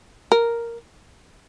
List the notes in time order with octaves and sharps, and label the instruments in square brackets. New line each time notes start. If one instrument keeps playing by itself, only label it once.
[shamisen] A#4